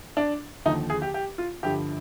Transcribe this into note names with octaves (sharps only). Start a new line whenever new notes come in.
D4
D#2 D3 F3 D#4
G#4
G4
G4
F4
G1 G2 D3 F3 G4